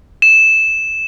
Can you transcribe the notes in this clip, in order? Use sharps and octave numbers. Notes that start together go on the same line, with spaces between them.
E7